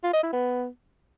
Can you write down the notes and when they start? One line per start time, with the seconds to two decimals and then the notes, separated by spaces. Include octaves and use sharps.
0.04 F4
0.13 D#5
0.23 E4
0.33 B3